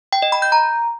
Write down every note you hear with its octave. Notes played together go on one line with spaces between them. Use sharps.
G5
D#5
B5
G6
A#5